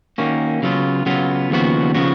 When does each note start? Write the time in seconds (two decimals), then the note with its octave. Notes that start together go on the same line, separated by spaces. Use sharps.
0.18 D#3 A#3 C#4 F#4
0.62 C#3 F#3 B3 F4
1.06 C#3 F#3 B3 F4
1.50 D#2 C#3 F3 B3 F#4
1.95 C#3 F3 B3 F#4